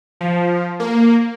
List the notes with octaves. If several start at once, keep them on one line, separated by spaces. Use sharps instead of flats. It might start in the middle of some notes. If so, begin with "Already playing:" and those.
F3
A#3